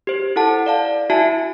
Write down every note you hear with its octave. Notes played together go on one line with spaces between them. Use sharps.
G4 C5
E4 A4 F#5 A5
D5 F5 A5
E4 F#4 E5 G#5 A5